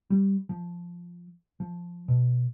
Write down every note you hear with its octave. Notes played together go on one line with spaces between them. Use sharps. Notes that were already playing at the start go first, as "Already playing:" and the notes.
G3
F3
F3
B2